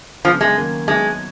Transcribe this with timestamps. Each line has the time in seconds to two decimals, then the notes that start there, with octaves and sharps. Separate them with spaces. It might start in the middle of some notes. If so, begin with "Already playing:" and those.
0.25 C#3 F3 F#3 B3
0.41 G#3
0.57 D#3 F#3 A#3 C#4
0.88 F#3 G#3 B3 D#4 F#4